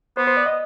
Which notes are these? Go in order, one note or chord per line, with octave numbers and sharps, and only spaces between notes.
B3 C5
C5
D5
D#5